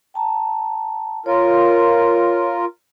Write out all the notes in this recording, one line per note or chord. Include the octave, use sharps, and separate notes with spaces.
G5 A5 A#5
F4 A#4 C#5